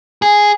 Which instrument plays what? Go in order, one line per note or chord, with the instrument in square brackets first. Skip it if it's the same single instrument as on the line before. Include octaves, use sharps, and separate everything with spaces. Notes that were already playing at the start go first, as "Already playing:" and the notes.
[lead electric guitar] G#4